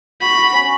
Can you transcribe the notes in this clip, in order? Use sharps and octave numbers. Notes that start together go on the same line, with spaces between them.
F#4 B5
F#4
C#4